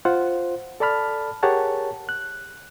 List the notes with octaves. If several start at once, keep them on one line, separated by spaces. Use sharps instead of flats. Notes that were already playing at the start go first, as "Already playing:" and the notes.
F4 C5 F#5
A4 D5 A5 B5 F6
G4 G#4 A#4 C#5 F#5 A5
F#6